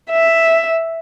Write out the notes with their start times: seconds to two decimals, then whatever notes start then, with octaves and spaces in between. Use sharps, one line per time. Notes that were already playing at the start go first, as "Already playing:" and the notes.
0.11 E5